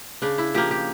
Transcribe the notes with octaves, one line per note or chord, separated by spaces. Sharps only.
C#3 D4
E4
F3 A#3 G4
G4